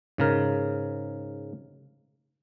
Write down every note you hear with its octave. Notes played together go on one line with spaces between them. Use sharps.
G#2 C#3 A#4